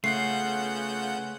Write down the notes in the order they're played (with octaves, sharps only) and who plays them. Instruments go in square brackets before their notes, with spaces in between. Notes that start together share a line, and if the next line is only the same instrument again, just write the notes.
[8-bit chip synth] C#3 F#5 G6 [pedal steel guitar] A3 [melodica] B3 C#4 F4 [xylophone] C7